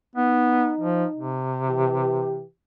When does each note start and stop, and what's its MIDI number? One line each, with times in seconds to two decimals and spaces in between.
0.15 0.71 59
0.15 1.40 63
0.80 1.05 53
1.15 2.46 48
1.66 2.43 52
1.66 2.43 67